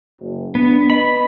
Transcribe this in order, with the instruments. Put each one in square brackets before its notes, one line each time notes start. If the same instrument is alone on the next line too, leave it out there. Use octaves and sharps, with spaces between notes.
[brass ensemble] F#1
[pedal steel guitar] B3 [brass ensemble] D4
[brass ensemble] B4 D#5 [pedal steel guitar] B5